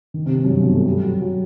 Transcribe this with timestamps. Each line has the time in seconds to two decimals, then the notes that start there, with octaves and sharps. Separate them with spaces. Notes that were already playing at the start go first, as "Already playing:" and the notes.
0.14 D#3
0.26 C3
0.39 C3
0.44 F#2
0.50 G2
0.62 B2
0.73 A3
0.85 G3
1.04 F#3
1.22 F#3